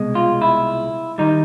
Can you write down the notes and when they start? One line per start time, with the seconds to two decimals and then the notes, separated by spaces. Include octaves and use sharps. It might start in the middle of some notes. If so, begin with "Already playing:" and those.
Already playing: C2 B2 G#3
0.15 F4
0.42 E4
1.18 D#3 G3 D#4